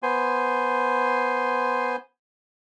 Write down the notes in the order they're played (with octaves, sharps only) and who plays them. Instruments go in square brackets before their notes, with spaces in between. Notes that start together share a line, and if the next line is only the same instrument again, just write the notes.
[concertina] B3 C5 G#5 C6